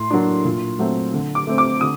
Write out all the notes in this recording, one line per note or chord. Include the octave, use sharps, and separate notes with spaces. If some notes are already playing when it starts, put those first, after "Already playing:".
Already playing: A2 C6
F#3 A#3 D4
A#2
F#3 A3 C4
D3
D6
A3 C4
D6
D3 D#6